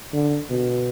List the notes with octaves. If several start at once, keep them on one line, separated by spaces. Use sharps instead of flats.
D3
B2